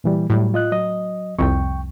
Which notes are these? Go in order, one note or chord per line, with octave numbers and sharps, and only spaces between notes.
A#2 E3 G3
A2 F#3 G3
F4 D#5 F#6
F#3 D#5
C2 F2 G5 C#6